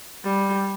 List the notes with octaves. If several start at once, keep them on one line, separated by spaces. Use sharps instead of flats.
G3